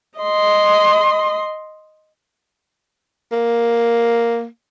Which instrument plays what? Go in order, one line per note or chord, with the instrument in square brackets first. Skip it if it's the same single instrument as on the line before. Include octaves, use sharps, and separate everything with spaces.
[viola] D#5 C6
[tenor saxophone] A#3